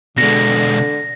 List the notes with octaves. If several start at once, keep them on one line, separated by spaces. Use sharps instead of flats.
B2 D3 G#3 A#6